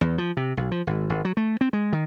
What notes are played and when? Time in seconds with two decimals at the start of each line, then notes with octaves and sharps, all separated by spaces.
0.01 E2
0.18 F3
0.37 C3
0.57 B1
0.71 F3
0.87 G#1
1.10 G#1
1.25 F#3
1.37 A3
1.61 C4
1.73 G#3
1.93 D#3